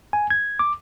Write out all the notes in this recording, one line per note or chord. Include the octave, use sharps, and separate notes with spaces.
G#5
G#6
D6